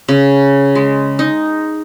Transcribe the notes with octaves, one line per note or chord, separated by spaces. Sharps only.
C#3
G#3
D#4